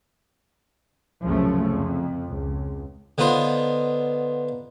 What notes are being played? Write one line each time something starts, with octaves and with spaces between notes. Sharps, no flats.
C2 F#2 C#3 F3 A3
F2
C#2
D3 B3 D#4 F4 C5